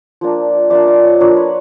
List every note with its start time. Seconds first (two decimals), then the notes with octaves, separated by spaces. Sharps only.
0.21 F3 A#3 D4
0.70 F3 A#3 D4 D5 E5
0.87 D#5 F5
1.04 C#5 D#5
1.20 F3 A#3 D4 B4 C#5
1.36 B4 C#5